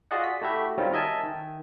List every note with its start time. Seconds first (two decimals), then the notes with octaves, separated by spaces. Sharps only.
0.11 F4 F#4 G#4 D5 D#5 F#5
0.24 B6
0.42 A3 E4 F#4 G4 E5
0.78 D#3 F#3 G3 C4 C#4 F4
0.92 A#4 D#5 E5 G#5 A5
1.23 D#3